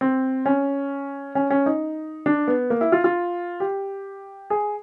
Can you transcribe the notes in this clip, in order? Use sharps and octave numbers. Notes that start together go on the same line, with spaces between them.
C4
C#4
C#4
C#4
D#4
D4
B3
A#3
E4
F4
F4
G4
G#4